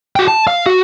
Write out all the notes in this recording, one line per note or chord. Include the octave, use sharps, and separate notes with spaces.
F#4 G5
A5
F5
F#4